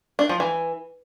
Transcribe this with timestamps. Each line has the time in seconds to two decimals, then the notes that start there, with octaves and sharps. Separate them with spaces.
0.19 D4
0.29 F3
0.40 E3